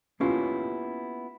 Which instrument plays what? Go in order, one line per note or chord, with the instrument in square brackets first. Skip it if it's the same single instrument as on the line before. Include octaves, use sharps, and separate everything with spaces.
[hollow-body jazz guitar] A#3 B3 C#4 E4 F4 G4